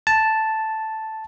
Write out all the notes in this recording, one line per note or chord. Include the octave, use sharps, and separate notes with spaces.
A5